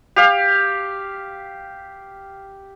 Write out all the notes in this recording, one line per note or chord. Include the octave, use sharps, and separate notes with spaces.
G4 F5